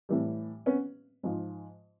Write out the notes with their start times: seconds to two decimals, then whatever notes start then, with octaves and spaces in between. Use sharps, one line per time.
0.09 A2 E3 G3
0.66 B3 C#4
1.23 G#2 F3